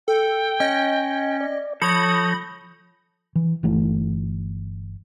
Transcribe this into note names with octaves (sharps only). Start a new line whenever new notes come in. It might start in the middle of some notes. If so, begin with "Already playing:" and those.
A4 G5
C#4 D#5
D5
F3 A4 C#5 B5 D#6 G6 A#6
E3
G1 E3 A3